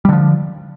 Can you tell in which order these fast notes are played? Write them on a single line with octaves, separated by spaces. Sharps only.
G3 D3 F3